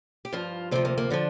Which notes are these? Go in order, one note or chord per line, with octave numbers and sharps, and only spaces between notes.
G4
G2 F3 F4
D2 C3 F3 C4
A#3
A#3
D3 F3 D4